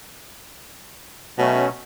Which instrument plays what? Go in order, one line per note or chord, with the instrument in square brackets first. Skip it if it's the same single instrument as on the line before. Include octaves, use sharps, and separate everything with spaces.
[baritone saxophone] B2 [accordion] F#3 A3 C#4